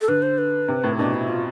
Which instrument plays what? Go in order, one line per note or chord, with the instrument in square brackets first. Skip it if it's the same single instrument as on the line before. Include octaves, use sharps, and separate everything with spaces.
[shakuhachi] A4
[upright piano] D3 [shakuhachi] B4
[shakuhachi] C5
B4
[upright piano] C3
A2
[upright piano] B2 [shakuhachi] D4
[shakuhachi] E4
F4